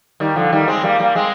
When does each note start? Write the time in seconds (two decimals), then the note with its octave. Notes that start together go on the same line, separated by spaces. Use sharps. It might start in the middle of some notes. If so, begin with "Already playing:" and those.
0.20 D#3 G3
0.36 D3 F3
0.52 D#3 G3
0.68 G#3 C4
0.83 G3 A#3
0.99 G3 A#3
1.15 G#3 C4